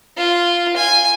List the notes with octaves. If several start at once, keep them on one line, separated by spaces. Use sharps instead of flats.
F4
G#5